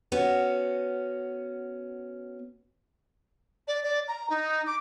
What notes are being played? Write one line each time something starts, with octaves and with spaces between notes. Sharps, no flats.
B3 C#4 F#4
D5
D5
A#5
D#4
D6